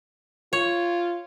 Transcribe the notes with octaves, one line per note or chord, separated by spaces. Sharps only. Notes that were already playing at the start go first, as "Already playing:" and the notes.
F4 C#5